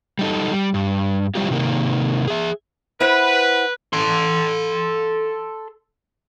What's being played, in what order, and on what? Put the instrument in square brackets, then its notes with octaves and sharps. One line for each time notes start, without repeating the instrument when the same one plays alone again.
[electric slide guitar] G3 D#4 A4
G3
G2
F#3 G3 C4 E4 F4 G4
C3 D#3 A#3
G#4 E5
[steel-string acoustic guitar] E4 C5 F#5 [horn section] B4
[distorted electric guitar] A4 C6